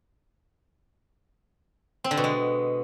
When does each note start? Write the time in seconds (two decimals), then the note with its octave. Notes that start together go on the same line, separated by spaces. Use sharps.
2.04 C4
2.11 D3
2.17 B2
2.24 G#3